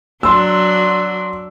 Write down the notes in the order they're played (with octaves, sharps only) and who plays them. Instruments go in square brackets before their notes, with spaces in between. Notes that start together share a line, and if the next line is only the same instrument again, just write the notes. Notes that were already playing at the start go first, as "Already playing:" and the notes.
[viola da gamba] F#3 D4 F#4 [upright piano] C6 E6